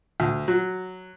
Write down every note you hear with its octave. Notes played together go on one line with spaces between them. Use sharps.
D2
F#3